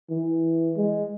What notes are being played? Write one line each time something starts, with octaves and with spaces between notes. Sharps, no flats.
E3
G#3